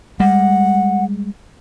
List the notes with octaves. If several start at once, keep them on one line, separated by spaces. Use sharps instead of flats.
G3 G#3 F#5